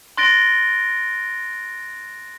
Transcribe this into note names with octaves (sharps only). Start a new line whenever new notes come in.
C6 F#6 A6 A#6 D7 G7